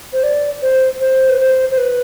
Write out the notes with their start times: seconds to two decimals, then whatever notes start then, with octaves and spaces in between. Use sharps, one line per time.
0.13 C5
0.23 D5
0.62 C5
1.00 C5
1.29 B4
1.38 C5
1.71 C5
1.77 B4